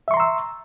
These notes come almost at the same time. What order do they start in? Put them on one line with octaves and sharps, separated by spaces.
E5 C#6 C6 A#5 E6